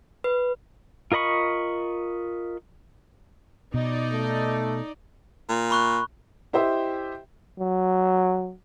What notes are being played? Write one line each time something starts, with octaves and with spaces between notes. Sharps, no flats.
B4
F4 A#4 D#5 B5 C#6
B2 D#4 D5
A3
A#2
B5 C#6 F#6
E4 G4 C5 D#5 E5 G5
F#3